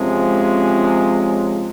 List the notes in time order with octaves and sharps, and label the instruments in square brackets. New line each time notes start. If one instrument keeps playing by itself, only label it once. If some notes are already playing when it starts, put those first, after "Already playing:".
Already playing: [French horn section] C3 F3 G#3 C#4